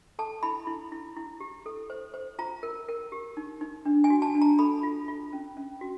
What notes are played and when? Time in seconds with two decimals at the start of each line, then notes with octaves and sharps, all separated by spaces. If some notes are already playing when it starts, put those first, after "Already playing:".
0.19 A4 A5
0.43 E4 B5
0.67 E4
0.92 E4
1.17 E4
1.40 G4
1.66 A4
1.90 C5
2.14 C5
2.39 F4 A#5
2.63 A#4
2.88 A#4
3.12 G4
3.37 D#4
3.61 D#4
3.85 D4
4.04 G#5
4.10 F#4
4.22 A5
4.35 D4
4.42 A#5
4.59 A4 B5
4.83 F4
5.08 F4
5.33 C#4
5.57 C#4
5.81 F#4